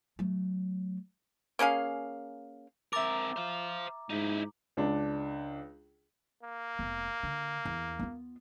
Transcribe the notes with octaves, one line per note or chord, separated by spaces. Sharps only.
F#3 A3
A#3 C#4 G#4 F5
C4 A#4 E5 A#5 D6 E6 A6
C5 F5
G#2 D#4 E4
C#2 D4
A#3
F1 B3
D3
E2
B3 F4